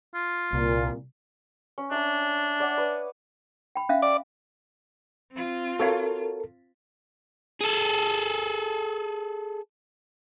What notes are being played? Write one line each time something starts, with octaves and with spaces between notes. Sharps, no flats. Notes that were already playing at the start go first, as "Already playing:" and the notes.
F4
C2 A#2
C#4
D4 E5 A#5
C#5 D5 F#5
B4 D#6
G5 B5
C#4 E5 F5
D5
C4 F4
F#4 A4 A#4 C#5 F5
G#4 A4